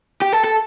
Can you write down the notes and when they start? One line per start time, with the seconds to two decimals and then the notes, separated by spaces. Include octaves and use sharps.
0.22 G4
0.33 A4
0.44 A4